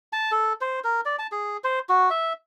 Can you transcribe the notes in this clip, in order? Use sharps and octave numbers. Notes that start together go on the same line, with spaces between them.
A5
A4
C5
A#4
D5
A5
G#4
C5
F#4
E5